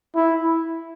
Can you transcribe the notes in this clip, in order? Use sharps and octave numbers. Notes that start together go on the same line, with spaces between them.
E4